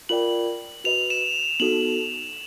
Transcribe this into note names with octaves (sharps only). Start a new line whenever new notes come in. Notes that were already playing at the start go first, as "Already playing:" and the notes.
F4 A#4 D5 G5 F#7
F#4 B4 D#5 F7
E7
B3 D#4 F#4 A4 F#7